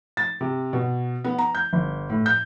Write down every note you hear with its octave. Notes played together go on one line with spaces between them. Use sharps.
A6
C3
B2
B3
A#5
G6
G1
A2
G6